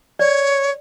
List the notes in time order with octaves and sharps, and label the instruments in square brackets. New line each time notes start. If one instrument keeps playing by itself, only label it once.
[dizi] C#5 [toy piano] D5